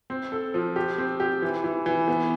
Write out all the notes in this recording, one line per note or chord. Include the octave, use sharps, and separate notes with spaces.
C4
A4
F3
G4
C4
G4
E3
E3
E3
B3